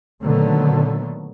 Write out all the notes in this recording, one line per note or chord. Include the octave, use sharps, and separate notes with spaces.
A#2 D3 D#3 F#3 A3 B3